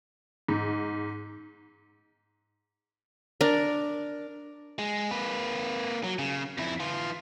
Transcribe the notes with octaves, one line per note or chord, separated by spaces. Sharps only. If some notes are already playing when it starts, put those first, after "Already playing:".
G#2
D4 A#4
G#3
A#3 B4
F#3
C#3
F2 E4
E3 F4